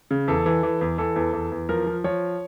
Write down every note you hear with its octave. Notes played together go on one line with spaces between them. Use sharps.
C#3
E2 A4
E3
E3
E2
E3 A4
E2
E2
E2
F3 A#4
F3
F3 C#5